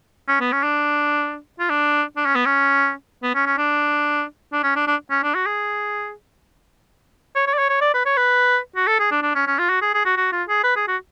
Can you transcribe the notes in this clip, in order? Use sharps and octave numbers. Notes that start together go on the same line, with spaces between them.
C#4
B3
C#4
D4
F4
D4
D4
C#4
B3
C#4
B3
C#4
C#4
D4
D4
C#4
D4
D4
C#4
D4
F#4
G#4
C#5
C#5
D5
C#5
C#5
D5
B4
C#5
B4
F#4
A4
G#4
D4
D4
C#4
C#4
F4
F#4
G#4
G#4
F#4
F#4
F4
G#4
B4
G#4
F#4